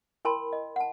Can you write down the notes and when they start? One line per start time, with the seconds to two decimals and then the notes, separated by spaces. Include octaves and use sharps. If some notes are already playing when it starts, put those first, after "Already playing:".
0.25 E4 A#4 G5 A5 B5 C6
0.53 D#5
0.76 F#5 A5